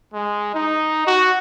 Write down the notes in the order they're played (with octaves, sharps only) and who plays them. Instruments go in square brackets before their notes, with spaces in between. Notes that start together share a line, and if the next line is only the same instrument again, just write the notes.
[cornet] G#3
D#4
F#4